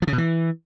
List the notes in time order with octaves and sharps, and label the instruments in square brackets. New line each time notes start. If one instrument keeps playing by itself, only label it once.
[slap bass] F3
C#3
B2
E3